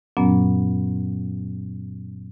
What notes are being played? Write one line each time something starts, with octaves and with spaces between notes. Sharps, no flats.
F#2 A#2 F#3 B3 C#4